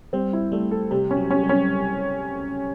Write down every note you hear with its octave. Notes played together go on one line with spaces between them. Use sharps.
G3 C4
E4
G3 A3
A4
C3 G3
C#4
F#3
C#4
G3
C#4